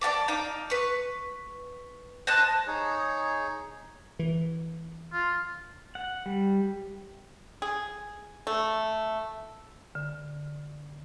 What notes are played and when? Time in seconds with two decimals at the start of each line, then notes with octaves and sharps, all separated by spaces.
0.01 D5 E5 A5 D6
0.28 D#4 F5 D6
0.70 B4 C#6
2.27 C5 D#5 A5 F#6
2.67 D#4 G#4 C#5
4.19 E3
5.13 F4
5.95 F#5
6.26 G3
7.62 G#4
8.47 A3
9.95 D3